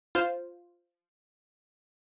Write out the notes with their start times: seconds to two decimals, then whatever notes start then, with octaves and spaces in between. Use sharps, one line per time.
0.15 F4 C5